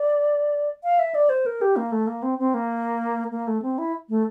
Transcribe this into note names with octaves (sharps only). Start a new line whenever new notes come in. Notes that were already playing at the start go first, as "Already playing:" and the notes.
Already playing: D5
F5
E5
D5
C5
A#4
G4
A#3
A3
A#3
C4
C4
A#3
A#3
A3
C4
E4
A3